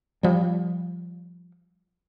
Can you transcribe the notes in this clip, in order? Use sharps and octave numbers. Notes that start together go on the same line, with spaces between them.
F3 G3